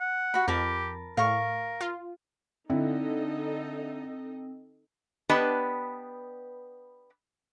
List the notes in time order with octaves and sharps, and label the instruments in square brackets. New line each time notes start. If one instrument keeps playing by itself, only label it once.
[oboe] F#5
[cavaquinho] F#4 B5
[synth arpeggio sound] F2 [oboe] G4 [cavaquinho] A#4 A5 B5
[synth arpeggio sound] A2 [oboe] A#4 [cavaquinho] F5 C#6
[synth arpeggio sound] F4
[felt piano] D3 E4 [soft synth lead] C4 [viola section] D#4 A4 D#5
[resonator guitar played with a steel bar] B3 D4 G4 B4 D#5 A5